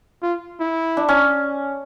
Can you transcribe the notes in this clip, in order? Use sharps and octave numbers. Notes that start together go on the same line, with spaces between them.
F4
E4
D4
C#4